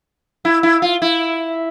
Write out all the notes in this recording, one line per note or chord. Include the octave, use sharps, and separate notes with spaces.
E4
E4
F4
E4